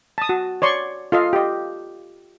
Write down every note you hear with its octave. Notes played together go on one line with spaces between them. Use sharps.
A5 D#6
F#4
C#5 D5 C6 C#6
F4 A4 D#5 F5
G4 D#5